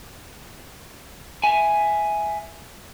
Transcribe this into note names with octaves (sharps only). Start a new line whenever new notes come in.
E5 G#5